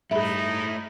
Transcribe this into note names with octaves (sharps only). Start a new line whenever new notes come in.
G2 A3 D#4 E4 G#4 E5 B5